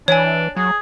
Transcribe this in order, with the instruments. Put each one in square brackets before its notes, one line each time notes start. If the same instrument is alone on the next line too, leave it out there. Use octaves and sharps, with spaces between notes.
[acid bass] E3 [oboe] D4 [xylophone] C#5 G#5
[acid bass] F#3 [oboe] G#4